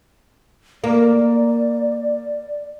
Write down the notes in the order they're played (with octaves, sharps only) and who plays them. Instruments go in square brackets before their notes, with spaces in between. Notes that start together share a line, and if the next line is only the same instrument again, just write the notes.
[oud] A#3 [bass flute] D5